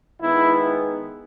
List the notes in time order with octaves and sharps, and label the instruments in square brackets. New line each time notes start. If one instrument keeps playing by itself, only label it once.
[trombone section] D#3 G#3 B3 E4